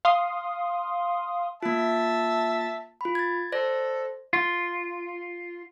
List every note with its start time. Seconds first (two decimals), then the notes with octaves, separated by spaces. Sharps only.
0.05 F5 C6 D#6
1.63 A#3 F4 E5 A5
3.01 F4 B5
3.15 G#6 A6
3.52 A4 C5 D5 A#6
4.33 F4